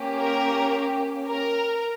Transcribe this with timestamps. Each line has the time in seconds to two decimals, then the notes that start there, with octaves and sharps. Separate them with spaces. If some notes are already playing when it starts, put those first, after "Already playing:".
Already playing: A#3 C#4 G4
0.20 A#4
1.26 A#4